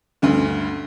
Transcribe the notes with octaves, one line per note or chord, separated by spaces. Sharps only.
D2 G2 D3